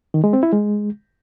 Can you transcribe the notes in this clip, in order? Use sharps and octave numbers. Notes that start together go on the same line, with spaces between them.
D#3
G#3
C4
E4
G#3